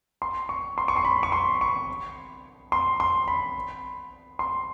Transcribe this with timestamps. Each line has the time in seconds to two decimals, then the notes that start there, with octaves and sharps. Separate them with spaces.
0.22 C6
0.49 C#6
0.78 C6
0.88 C#6
0.96 C6
1.05 B5
1.23 C#6
1.32 C6
1.61 C#6
2.72 C6
3.00 C6
3.28 B5
4.39 C6